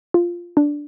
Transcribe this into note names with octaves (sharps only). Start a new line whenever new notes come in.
F4
D4